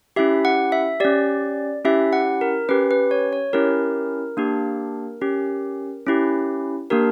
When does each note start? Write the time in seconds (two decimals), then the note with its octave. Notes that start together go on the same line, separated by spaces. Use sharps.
0.16 C#4 E4 G4 E5
0.45 F#5
0.72 E5
1.00 C#4 G4 D5
1.85 C#4 E4 G4 E5
2.13 F#5
2.41 A#4
2.69 C#4 G4 B4
2.91 B4
3.11 C#5
3.33 C#5
3.53 C#4 E4 G4 A#4
4.37 A#3 D4 G4
5.21 C#4 G4
6.06 C#4 E4 G4
6.90 A#3 D4 G4 A#4